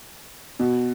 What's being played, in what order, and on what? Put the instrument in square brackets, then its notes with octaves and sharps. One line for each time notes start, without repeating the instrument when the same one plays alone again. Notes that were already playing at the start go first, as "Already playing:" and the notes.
[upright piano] B2